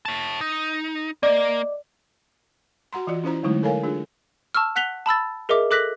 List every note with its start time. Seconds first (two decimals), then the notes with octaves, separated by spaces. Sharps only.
0.05 C#5 A5
0.41 D#4
1.23 A#3 D5 D#5 D6
2.93 F#4 F#5 A#5 C6
3.07 E3 F4 D5
3.24 C#4 E4 C5 A#5
3.43 D3 F#3 G#3 A3 D#4 E4
3.63 A4 A#4 C#5 F5 G#5
3.83 D4 F4 G#4
4.55 A5 C#6 E6 F6
4.76 F#5 F#6 B6 F7 G7
5.06 A5 B5 E6 A6
5.49 G#4 A#4 D#5 E5 D6
5.71 A4 D6 F#6 A#6 B6 F#7